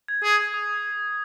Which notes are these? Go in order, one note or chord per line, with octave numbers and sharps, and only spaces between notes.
G#6
G#4
D#6